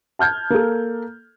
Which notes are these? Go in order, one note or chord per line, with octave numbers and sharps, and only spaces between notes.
A5 F6 G6 G#6
A#3 A4